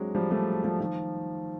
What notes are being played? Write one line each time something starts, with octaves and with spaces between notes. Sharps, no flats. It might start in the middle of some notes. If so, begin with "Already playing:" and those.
Already playing: F#3 G#3 C4 D4
F3 G3
G3 A3
F3 G3
D#3 F3